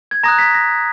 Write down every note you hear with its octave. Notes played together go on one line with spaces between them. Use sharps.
G#6
A#5 D#6 F#6 A#6
B6
A#6